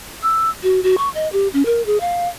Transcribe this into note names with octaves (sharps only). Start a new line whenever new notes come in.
E6
F#4
F#4
C#6
D#5
G4
C#4
A#4
G#4
F5